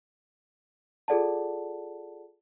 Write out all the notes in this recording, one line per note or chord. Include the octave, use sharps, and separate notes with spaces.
F4 G#4 A4 D5 F#5 A5